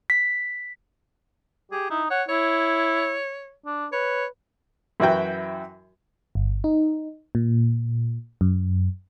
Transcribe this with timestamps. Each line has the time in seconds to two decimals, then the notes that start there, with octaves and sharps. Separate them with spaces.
0.10 B6
1.72 G4 G#4
1.91 D#4 E4
2.10 C#5 F#5
2.29 E4 C#5
3.66 D4
3.93 B4 C#5
5.00 F#2 E3 E4 F#4 G5
6.35 G1
6.64 D#4
7.35 A#2
8.41 F#2